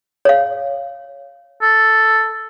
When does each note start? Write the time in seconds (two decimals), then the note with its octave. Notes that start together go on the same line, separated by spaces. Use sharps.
0.25 C#5 F5
1.62 A4